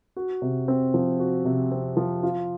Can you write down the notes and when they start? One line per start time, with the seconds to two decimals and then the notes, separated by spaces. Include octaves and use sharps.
0.16 F#4
0.42 C3
0.68 C4
0.94 F3
1.20 F#4
1.45 C3
1.71 C4
1.97 F3
2.23 F4